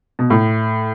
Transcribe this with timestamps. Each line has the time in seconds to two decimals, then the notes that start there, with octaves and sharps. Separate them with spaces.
0.19 B2
0.30 A2